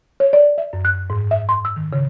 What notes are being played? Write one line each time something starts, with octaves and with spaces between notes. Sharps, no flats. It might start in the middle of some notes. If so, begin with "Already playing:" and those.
C#5
D5
E5
F#2
F#6
G#2
E5
C6
E6
D#3
C#3